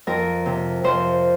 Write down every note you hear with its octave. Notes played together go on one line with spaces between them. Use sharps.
F2 A#4
C3
F2 C5